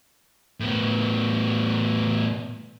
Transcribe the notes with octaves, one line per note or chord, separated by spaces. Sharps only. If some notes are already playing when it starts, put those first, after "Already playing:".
A2 B3